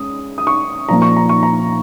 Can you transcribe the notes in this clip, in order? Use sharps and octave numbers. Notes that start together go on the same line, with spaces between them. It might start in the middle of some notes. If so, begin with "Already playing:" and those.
Already playing: G#3 C#4 D#6
D#6
C#6
A#2 F3 A#3 A#5
C#6
A#5
C#6
A#5